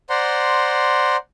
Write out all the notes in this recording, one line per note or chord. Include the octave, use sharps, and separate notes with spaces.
C5 D5 F#5 A#5 C6